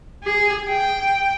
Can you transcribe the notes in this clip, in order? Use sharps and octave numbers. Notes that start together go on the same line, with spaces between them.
G#4
G5